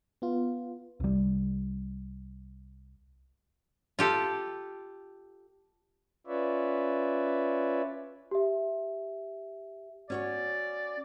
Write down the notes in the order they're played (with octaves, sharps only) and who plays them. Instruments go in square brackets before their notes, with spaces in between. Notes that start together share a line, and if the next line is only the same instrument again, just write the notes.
[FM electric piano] B3 F4
[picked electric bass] C2 G3
[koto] F4 G4 A4
[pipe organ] C#4 F4 B4 C#5 D5 E5
[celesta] G4 E5
[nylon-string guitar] C#4 F#4 C#5 [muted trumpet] D5